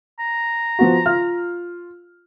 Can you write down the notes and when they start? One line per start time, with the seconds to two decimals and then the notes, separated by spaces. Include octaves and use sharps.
0.19 A#5
0.79 F3 B3 F#4
1.06 F4 F6